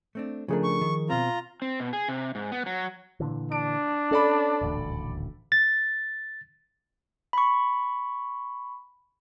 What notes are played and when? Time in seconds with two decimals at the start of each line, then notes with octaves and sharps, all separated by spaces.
0.15 A3 C4 D4
0.48 C#3 F3 A3 D4 G#4 A#4
0.64 C#6
0.81 D#3
1.10 B2 C4 F4 A#5
1.62 C4
1.80 B2
1.93 G#4
2.08 C3
2.35 G#2
2.52 B3
2.66 F#3
3.20 A#2 D3 E3
3.52 D4 D7
4.11 C#4 A4 D5 B5
4.61 D#1 A1 D2
5.52 A6
7.33 B5 C#6